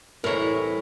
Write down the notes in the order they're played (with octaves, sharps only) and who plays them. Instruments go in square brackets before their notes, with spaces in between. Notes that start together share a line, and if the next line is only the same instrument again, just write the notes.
[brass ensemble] C2 [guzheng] A2 E3 A#5 [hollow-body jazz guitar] A#4 C#5